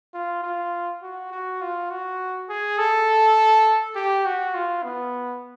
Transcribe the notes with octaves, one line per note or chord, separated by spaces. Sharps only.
F4
F4
F#4
F#4
F4
F#4
G#4
A4
G4
F#4
F4
B3